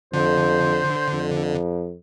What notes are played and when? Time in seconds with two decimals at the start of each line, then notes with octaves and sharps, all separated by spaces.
0.14 F2 D3 C5
1.13 F2